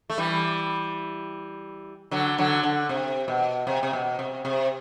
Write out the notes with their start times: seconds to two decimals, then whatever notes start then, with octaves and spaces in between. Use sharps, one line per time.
0.10 A3
0.18 E3 G3
2.11 D3 F#3
2.38 D3 F#3
2.63 D3
2.89 C3
3.28 B2
3.67 C3
3.83 C3
3.93 B2
4.19 C3
4.45 C3